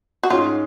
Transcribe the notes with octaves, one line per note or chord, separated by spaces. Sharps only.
F#4
G#2 G#3 C#4 F4